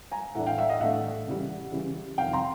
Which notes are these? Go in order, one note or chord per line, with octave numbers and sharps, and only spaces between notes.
G#5 A#5
A2 E3 A3 D4 E5 F#5
F5 G5
E5 F#5
D#5 F5
A2 E3 A3 D4 E5 F#5
C#3 E3 G3
C#3 E3 G3
F2 C3 D#3 F5 G5
A#5 C6